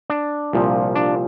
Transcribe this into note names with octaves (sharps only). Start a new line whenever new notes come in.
D4
C2 A#2 F3
D4